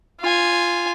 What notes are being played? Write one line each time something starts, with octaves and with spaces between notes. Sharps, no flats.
F4 G#5